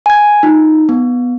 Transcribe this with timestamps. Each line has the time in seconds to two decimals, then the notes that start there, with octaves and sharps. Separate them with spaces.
0.06 G#5 G#6
0.43 D#4 F4
0.89 B3